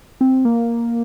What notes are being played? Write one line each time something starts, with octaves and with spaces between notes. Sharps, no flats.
C4
A#3